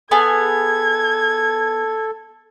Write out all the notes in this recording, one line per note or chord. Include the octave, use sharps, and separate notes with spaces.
B3 G#4 A4 G#5 G#6